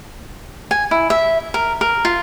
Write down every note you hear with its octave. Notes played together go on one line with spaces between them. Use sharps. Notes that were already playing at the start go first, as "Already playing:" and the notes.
G#5
E4
E5
A#4
A#4
F4